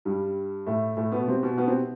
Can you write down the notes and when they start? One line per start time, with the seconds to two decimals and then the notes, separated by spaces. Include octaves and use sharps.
0.05 G2 G3
0.67 A2 A3
0.97 A2 A3
1.12 B2 B3
1.28 C3 C4
1.42 B2 B3
1.58 B2 B3
1.68 C3 C4